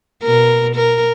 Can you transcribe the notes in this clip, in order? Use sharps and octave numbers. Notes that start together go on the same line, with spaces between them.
B2 A#4
A#4